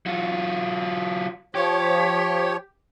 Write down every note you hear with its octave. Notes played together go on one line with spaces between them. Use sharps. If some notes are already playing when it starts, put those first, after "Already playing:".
F#3 F4
F3 G4 C#5